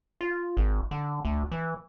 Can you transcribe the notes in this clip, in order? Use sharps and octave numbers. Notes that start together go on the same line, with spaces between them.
F4
G#1
D3
D2
E3